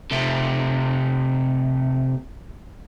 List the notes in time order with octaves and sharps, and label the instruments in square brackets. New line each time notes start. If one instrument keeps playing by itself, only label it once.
[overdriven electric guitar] C3 A3